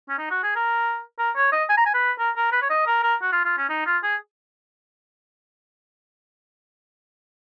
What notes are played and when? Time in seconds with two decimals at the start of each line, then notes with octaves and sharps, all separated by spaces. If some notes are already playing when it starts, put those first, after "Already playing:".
0.09 C#4
0.18 D#4
0.31 F#4
0.43 G#4
0.56 A#4
1.19 A#4
1.36 C#5
1.53 D#5
1.69 G#5
1.78 A#5
1.86 G#5
1.94 B4
2.19 A#4
2.37 A#4
2.53 B4
2.62 C#5
2.70 D#5
2.87 A#4
3.03 A#4
3.22 F#4
3.32 F4
3.45 F4
3.58 C#4
3.70 D#4
3.86 F4
4.04 G#4